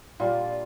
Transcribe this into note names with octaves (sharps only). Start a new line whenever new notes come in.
A#2 G3 A#3 D4 F4